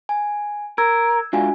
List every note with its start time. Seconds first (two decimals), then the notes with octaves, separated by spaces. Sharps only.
0.09 G#5
0.78 A#4 E6 G#6
1.33 G#2 D4 F4 F#4 G#5